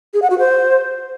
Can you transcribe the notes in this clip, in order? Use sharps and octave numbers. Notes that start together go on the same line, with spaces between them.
G#4
F#5
F#4
C5